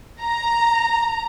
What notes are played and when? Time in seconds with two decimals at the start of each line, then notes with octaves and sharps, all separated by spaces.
0.21 A#5